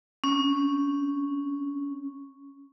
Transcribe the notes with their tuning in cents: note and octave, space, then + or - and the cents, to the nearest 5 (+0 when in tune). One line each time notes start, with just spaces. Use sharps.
C#4 +0